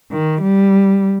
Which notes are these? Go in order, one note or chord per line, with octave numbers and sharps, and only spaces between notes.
D#3
G3